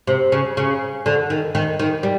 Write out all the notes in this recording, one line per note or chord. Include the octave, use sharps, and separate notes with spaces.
C3
C#3
C#3
D3
D#3
D#3
D#3
G3